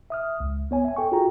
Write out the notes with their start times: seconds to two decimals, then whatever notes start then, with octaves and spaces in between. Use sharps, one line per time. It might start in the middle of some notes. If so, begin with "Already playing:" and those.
0.10 E5 D#6 F6
0.40 C#2
0.71 B3 C#5 G#5
0.85 E5 G#5
0.96 A4 G5 C#6
1.12 F4 F#4 G#4 A4 G5 A#5